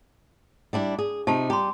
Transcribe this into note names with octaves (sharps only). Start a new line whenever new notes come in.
G3 D4 E4
G#4
C3 D#4 F4 G4 A5
G3 G4 A#5 C6